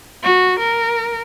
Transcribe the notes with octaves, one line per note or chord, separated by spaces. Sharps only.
F#4
A#4